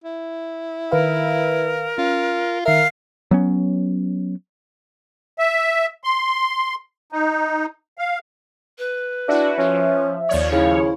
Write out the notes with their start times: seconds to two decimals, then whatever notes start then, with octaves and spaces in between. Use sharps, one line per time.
0.04 E4
0.91 D#3 A#4 B4 F5
1.98 C#4 F4
2.66 D#3 A#4 E5 F5
3.31 F#3 B3 C#4
5.38 E5
6.04 C6
7.12 D#4
7.98 F5
8.78 B4
9.28 D4 E4 F#4 E5
9.58 F3 C#4
10.29 D#2 F3 C#5 D5
10.52 C#3 E4 F5